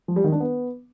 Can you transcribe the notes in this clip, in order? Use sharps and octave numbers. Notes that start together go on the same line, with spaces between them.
F3
G3
D#3
D4
B3